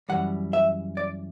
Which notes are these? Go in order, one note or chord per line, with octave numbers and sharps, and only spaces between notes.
F#2 E3 G3 F#5
E5
D5